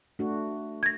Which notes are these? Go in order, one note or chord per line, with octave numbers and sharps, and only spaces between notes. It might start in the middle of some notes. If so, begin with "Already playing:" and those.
A3 D4 F#4
G#6 A#6